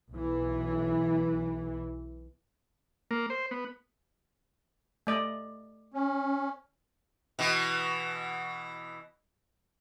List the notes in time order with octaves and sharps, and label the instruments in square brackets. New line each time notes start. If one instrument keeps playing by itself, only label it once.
[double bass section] B1 E3
[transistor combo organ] A#3
C5
B3
[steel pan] A3 D5 D#5
[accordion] C#4
[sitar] B2 E3